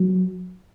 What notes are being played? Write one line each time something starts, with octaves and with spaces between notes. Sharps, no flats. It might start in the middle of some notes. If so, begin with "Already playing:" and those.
Already playing: F#3